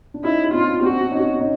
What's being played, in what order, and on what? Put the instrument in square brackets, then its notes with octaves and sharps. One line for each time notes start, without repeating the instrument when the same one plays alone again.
[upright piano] D4
[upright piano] C#4 D#4 [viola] E4
[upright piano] D#4
[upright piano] C4 D4 [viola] F4
[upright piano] C4 D4 [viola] F#4
[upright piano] C#4 D#4
C#4 D#4